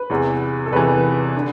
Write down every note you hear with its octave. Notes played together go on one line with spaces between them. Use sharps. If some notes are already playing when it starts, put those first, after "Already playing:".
Already playing: B4
E2 C3 E3
A4
E2 C3 E3 B4
D3